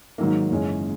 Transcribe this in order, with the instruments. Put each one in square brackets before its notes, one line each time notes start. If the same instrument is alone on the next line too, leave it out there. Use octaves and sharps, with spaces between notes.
[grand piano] G#2 D#3 F#3 A#3
F#1 F#2 E3 G#3 C#4